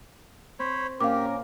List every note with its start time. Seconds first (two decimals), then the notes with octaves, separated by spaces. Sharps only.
0.59 C4 C5 C#5 B5
1.00 A#2 C#4 G4 A#4 F5 D6